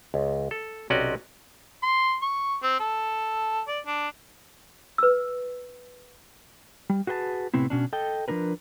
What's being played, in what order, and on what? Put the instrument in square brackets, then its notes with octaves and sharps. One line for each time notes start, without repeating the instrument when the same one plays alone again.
[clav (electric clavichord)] C#2
A4
B1 C3 C#4 F#4 D5 D#5
[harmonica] C6
C#6
C4
A4
D5
D4
[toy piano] B4 E6
[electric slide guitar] G3
F#4 G#4 B4 G5 A5
A2 C3 B3 C4 E4
B2 C#4 D4
A4 D#5 G5
F3 F#3 D4 A#4 B4